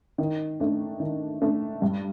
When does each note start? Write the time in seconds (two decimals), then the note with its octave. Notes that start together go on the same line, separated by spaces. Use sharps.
0.18 D#3
0.60 A3 D4
1.00 D#3
1.42 A3 D4
1.82 G2